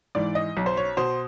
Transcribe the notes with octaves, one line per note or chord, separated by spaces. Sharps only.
G#2 E3 D5
D#5
B1
C5
C#5
B2 C5